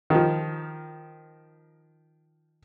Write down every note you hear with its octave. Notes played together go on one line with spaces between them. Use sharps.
D#3 F3